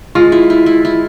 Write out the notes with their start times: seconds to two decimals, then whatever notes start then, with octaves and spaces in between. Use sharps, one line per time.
0.15 G#3 F4
0.32 E4
0.50 E4
0.66 E4
0.85 E4